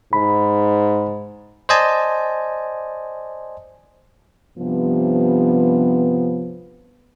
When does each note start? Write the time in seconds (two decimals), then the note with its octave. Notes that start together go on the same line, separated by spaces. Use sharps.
0.13 G#2 B5
1.69 C5 D5 D#5 G#5 A5
4.57 G2 C3 F3 B3